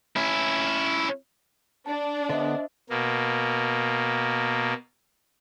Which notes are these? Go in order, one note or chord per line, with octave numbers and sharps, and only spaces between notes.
C#4 E4
D4 A5
D3 B3 C5 D#5 E5
B2 A#3